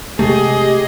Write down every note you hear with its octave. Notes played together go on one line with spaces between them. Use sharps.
C3 G#3 A3 G4 G#4 D#5